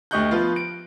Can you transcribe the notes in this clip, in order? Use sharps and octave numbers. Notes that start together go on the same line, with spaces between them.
D2 G4 D#5 C#6 F#6 G6
F3 B3 F4
D7